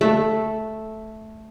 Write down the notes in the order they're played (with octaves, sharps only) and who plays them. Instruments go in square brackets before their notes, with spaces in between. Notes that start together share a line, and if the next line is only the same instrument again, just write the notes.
[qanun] A3